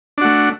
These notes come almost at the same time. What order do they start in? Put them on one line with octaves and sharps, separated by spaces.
D4 F#4 A3